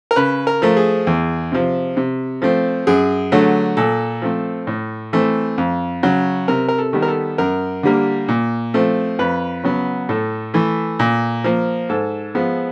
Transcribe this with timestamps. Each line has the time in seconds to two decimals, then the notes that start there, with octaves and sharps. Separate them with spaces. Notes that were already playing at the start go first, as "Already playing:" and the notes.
0.11 A#4
0.16 C#3 B4
0.47 A#4
0.62 F3 A3
0.77 G#4
1.07 E2
1.52 C3 F3
1.97 C3
2.42 F3 A3 C4
2.87 F#2 G#4
3.32 D3 F#3 A3
3.77 A#2 A4
4.22 F3 A3 C4
4.67 A2
5.13 E3 A3 C4
5.58 F2
6.03 C#3 F#3
6.48 C3 A#4
6.68 A#4
6.78 A4
6.93 D#3 G3 B3
7.02 A#4
7.08 A4
7.38 F#2 A#4
7.83 D3 G3 A#3
8.28 A#2
8.74 F3 A3 C4
9.19 F2 B4
9.64 C#3 F#3 B3
10.09 A2 A4
10.54 E3 A3
10.99 A#2
11.44 F3 A#3
11.89 G#2 A4
12.35 F3 G#3 B3